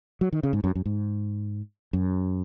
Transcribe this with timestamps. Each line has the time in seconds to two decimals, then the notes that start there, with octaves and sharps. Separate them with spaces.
0.21 F#3
0.32 D#3
0.43 C#3
0.53 G#2
0.64 F#2
0.75 F#2
0.86 G#2
1.93 F#2